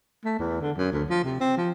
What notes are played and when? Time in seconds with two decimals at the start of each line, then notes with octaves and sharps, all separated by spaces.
0.25 A3
0.39 E2
0.61 D3
0.77 F#2
0.92 D2
1.09 F3
1.24 C3
1.40 C4
1.57 F3